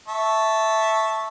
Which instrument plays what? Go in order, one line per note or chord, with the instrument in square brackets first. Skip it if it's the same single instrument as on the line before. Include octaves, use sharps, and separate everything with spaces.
[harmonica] E5 A5 C#6